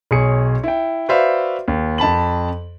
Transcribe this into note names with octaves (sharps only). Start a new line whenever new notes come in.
B1 G#4 C#5 C#7
E4 G5
F#4 B4 C5 D5 E5 F5
D#2
F2 A5 B5 F#7